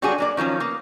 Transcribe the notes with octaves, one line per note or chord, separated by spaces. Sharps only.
F#3 G3 B3 D4 F#4 G#4
F#3 A#3 D5
D#3 F3 F#3 C#4
A#3 B3